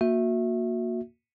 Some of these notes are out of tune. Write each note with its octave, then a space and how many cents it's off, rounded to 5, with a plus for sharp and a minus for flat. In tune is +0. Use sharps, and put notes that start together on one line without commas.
A#3 +0 F#4 -25 E5 +0